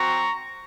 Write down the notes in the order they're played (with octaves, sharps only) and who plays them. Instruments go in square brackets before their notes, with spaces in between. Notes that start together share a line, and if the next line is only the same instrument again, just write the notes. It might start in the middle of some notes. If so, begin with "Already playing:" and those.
Already playing: [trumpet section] C4 F#4 A#5 C#6